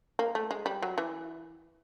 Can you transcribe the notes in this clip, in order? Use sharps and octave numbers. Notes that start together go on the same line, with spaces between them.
A#3
A3
G#3
G3
F#3
E3